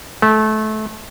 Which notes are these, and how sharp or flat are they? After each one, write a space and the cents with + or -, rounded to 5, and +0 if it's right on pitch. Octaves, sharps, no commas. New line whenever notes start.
A3 -25